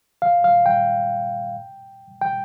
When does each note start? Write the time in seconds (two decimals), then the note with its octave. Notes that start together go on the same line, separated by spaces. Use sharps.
0.22 F5
0.44 F5
0.66 G5
2.21 G5